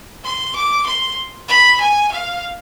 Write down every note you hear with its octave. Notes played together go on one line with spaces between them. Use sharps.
C6
D6
C6
B5
G#5
F5